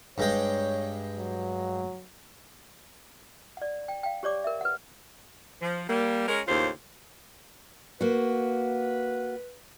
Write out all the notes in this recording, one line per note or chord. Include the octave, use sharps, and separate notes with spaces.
G2 G#3 C#5 G5
F#3
D5 F#5
G5
F5 G5
G4 C#5 D5 D6
A#4 E5
B4 F#5
F3
G3 A#3
G#3 C#4 A#4
D#2 A2 C#3 F4 C5
A#3 F#4 B4